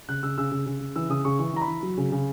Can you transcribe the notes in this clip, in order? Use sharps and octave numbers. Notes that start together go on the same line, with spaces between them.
C#3 F#6
C#3 E6
C#3 E6
C#3
C#3
C#3
E3 E6
C#3 D#6
C#3 C#6
E3 C#6
E3 A#5
B5
E3
F#3
C#3
C#3